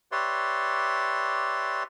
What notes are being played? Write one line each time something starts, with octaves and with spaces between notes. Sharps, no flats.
G4 B4 C#5 D5 E5 C6